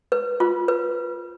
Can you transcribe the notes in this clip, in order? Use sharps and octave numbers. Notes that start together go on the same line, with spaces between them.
B4
F4
B4